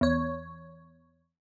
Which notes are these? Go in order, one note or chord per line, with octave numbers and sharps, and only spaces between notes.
E2 C#5